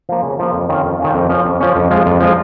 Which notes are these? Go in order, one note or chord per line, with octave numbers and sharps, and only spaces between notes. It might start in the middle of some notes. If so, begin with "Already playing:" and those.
F3 A#3
C#3
F3 A#3
F2
D#3 C#4 F4
F2
D#3 C#4 F4
F2
F3 C#4
F2
F3 C#4
F2
F3 G#3 F4
F2
F3 G#3 F4